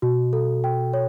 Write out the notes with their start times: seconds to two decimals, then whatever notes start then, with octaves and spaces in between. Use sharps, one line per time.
0.02 B2 F#4
0.33 A4
0.64 G5
0.94 C#5